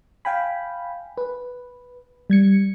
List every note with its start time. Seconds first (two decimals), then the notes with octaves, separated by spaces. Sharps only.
0.25 F5 G5 G#5 B5
1.17 B4
2.30 G3 G#6 C#7